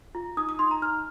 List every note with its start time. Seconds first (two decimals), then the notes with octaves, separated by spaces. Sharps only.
0.15 F4
0.37 D#4 D#6
0.49 D#6
0.59 D#4 C6
0.71 A#5
0.82 D#4 F6